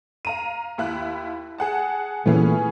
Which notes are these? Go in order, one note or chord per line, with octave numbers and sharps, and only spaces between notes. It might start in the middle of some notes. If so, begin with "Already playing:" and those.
F5 A#5 D#7
D#2 E4 F#6
G#4 F#5 A5
A#2 E3 A3 B3 C#4 G#4